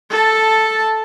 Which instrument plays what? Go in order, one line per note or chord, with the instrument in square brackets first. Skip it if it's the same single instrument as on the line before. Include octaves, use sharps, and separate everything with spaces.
[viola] A4 A5